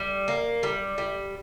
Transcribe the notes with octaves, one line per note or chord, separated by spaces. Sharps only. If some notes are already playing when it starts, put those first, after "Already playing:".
Already playing: G3
A#3
G3
G3